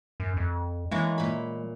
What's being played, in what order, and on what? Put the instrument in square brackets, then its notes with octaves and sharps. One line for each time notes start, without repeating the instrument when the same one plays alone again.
[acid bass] F#2
F2
[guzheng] E3 A#3 C#5 [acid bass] G#3
[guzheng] A#2 B5